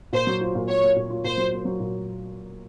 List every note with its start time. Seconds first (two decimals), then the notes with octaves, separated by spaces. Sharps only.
0.13 A#2 C5
0.27 F#3
0.41 F4
0.55 A#2
0.68 A#3 C#5
0.83 A#3
0.96 A#2
1.10 F4
1.24 A#2 C5
1.38 F#3
1.52 A#3
1.65 F#3
1.80 A#2